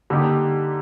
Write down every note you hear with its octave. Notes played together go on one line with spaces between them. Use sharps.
D3 G3 A#3 D#4 G4